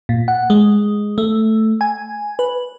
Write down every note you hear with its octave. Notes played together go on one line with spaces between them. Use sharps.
A#2
F#5
G#3
A3
G#5
B4